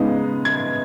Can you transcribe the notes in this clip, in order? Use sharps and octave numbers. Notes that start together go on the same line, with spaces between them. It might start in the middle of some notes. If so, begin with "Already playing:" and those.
Already playing: C#3 G#3 B3 D#4
G#6